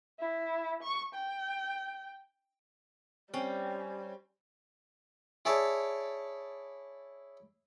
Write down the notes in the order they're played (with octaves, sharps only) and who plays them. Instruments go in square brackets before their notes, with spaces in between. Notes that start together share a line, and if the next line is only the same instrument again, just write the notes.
[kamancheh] E4
C#6
G5
[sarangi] G3 [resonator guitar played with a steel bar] C4 [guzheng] C#4
[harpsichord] E4 G#4 C#5 D5 E5 A5